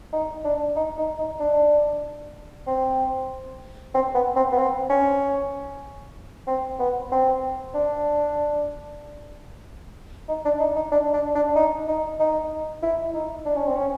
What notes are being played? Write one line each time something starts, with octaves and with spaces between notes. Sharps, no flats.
D#4
D4
D#4
D#4
D#4
D4
C4
C4
B3
C4
B3
C4
C#4
C4
B3
C4
D4
D#4
D4
D#4
D#4
D4
D4
D4
D#4
D#4
D#4
E4
D#4
D4
C#4
C4
C#4